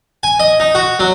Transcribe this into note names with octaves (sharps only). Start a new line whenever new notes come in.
G#5
D#5
D#4
F#4
F#3